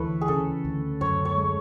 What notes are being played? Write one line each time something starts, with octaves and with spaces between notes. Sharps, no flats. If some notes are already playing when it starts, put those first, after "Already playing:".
Already playing: D2 E3 A4 B4 C#5
G#4
C#3 A4
D2
F#2 C#5
C#5
G#3